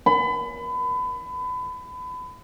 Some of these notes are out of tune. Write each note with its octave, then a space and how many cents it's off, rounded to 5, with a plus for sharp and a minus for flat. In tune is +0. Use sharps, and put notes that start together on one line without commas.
B5 +30